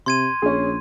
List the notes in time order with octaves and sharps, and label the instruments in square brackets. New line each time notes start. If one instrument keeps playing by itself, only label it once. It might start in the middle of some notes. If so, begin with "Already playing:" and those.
[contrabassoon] C3 [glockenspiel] C6 G#6 D#7
[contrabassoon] A#1 [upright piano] C#4 G#4